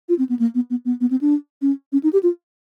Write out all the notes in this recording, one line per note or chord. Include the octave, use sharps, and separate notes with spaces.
F4
C4
B3
A#3
B3
B3
B3
B3
C4
D4
C#4
C#4
D#4
G4
F4